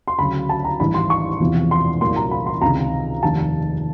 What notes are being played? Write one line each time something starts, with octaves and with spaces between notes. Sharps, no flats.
C6
D2 C#3 F#3 B5
A5
A#5
A1 G#2 D#3 G3 B5
C6
C#6
E1 E2 C3 F3
C6
C2 A#2 F#3 A#3 C6
A#5
B5
C6
C#2 C3 D#3 A#5
F1 D#2 D#3 A5